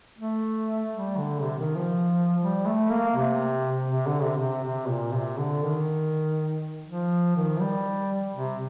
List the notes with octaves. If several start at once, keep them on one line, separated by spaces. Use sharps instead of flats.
A3
G3
D3
C3
D#3
F3
G3
A3
A#3
C3
C3
D3
C3
C3
C3
A#2
C3
D3
D#3
F3
D#3
G3
C3